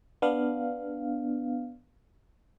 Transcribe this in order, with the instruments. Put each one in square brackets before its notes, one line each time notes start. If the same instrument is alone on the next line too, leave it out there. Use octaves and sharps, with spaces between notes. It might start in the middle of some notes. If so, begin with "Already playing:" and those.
[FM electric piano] B3 D4 F5